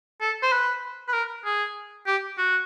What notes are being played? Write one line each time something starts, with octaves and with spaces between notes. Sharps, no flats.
A4
C5
B4
B4
A#4
G#4
G4
F#4